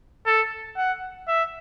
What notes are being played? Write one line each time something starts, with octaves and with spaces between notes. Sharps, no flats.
A4
F#5
E5